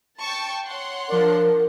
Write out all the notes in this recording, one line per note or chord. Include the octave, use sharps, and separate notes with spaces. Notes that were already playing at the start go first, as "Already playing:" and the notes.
G5 A5 C#6
C#5 F#5 C6
F3 D4 A#4